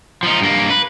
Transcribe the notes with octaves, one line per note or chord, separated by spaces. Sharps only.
F3 D#4
G2 A#3
B4